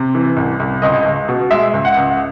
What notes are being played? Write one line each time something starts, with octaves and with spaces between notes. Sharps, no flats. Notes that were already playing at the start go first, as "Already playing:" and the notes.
Already playing: C3
E3
C2
C2
C#2 D#5
C#2
B2
G#3 E5
C#2
F#5
C#2